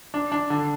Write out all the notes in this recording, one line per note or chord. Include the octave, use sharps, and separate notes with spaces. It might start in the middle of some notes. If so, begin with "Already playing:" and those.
D4
D4
D3